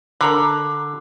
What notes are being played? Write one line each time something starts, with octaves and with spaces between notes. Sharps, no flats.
D3 A#4 A#5 B5